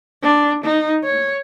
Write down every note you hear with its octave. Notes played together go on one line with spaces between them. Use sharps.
D4
D#4
C#5